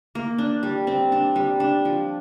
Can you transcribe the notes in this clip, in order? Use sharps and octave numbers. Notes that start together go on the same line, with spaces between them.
A#3
D4
G3
C4
D4
G3
D4
F3